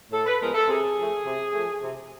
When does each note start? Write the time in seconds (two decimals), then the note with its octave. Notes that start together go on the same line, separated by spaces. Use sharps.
0.11 A2 A4
0.25 B4
0.39 F3 G#3 B3 A#4
0.54 A4
0.68 C3 G#4
0.97 F3 A3
1.25 C3
1.54 F3 A3
1.82 C3